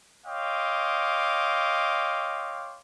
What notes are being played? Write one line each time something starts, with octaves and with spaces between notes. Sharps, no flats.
C#5 D#5 F5 G5 C6 D6